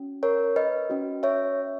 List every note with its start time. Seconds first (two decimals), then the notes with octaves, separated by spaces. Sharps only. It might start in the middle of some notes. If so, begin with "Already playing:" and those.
Already playing: C#4 F#4
0.23 A#4 C#5
0.56 B4 D#5
0.90 C#4 F#4
1.23 C#5 E5